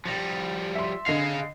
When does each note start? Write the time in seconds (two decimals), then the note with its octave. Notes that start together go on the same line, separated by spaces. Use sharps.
0.06 F3 G3 A6 A#6 C#7
0.75 E5 C6
1.06 D3 G#4 D#5 F5 C7